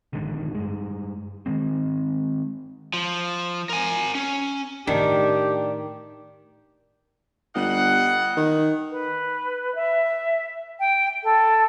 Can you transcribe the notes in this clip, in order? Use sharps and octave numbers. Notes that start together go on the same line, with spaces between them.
A#1 G#2 D3 D#3
G2 G#3
D#3 E3 G#3 C4
F3
A#4 G#5
C#4
A2 D#3 A3 D4 G4 A#4
G1 G3 D#5 F#5
D#3
B4
E5
G5
A4